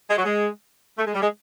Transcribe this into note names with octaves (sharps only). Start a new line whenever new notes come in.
G#3
F#3
G#3
A3
G#3
G3
G#3